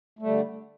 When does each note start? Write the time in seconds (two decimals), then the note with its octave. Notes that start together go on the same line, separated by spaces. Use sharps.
0.19 A3
0.22 G3
0.26 D3